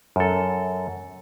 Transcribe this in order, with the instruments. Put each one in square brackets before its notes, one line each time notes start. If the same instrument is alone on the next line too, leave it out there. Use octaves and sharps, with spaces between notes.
[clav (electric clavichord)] F#2 A4